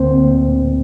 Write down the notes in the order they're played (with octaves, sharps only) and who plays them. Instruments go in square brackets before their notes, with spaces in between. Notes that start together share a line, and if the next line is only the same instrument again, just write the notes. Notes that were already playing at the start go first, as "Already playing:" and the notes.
Already playing: [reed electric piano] D2 D3 A#3 C4 C5